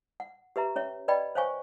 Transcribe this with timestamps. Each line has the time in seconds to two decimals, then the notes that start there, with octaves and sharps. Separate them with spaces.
0.20 F#5
0.56 G4 B4 E5 A#5
0.76 C#4 C#5 E5
1.08 B4 D5 D#5 G5 B5
1.35 C5 C#5 F5 G#5 C#6